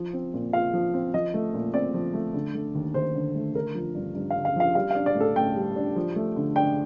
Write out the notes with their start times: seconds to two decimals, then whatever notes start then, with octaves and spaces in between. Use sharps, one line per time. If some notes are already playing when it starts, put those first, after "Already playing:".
Already playing: F3
0.13 C4
0.34 A#2
0.53 F4 F5
0.73 F3
0.94 C4
1.14 F3 D#5
1.34 A3
1.54 A#2
1.74 C4 D5
1.94 F3
2.14 A3
2.34 D3
2.54 A3
2.75 D#2
2.94 D#2 C5
3.15 D3
3.35 A3
3.55 D3 A#4
3.75 F3
3.95 G2
4.15 G2
4.30 F5
4.36 D3
4.45 F5
4.56 F3 F5
4.75 G3 F5
4.91 D4 F5
5.06 D5
5.15 A2
5.20 A4
5.36 A2 G5
5.56 G3
5.76 D4
5.96 F3
6.16 A3
6.36 D3
6.56 D4 G5